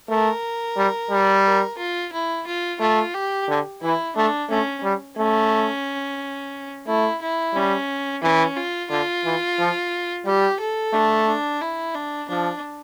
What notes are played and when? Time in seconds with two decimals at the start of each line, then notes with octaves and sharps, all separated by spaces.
0.09 A3 A#4
0.77 G3
1.11 G3
1.45 A#4
1.78 F4
2.12 E4
2.47 F4
2.80 A3 F4
3.14 G4
3.49 D3
3.82 E3 E4
4.16 A3 D4
4.50 A3 C#4
4.83 G3
5.18 A3 C#4
6.87 A3 E4
7.21 E4
7.54 G3 C#4
8.23 E3 C#4
8.57 F4
8.90 D3 F4
9.24 E3
9.59 F3
10.26 G3 G4
10.60 A4
10.94 A3 D4
11.27 D4
11.61 E4
11.95 D4
12.29 F3 D4